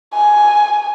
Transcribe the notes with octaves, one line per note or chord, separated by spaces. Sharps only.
G#5